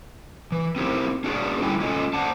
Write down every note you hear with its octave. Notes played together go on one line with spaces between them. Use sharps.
E3
C4 D#4 E4 G4 A#4 C5
C#4 D4 F#4 G#4 A#4 D5
D3 G3 E4 G5 G#5
G#3 C#4 F4 A4 D#5 G#5
C5 D5 F#5 A5